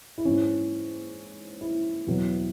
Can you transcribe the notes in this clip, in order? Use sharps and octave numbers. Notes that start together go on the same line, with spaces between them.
E4
G#2 E3 C#4
E4
E2 B2 F#3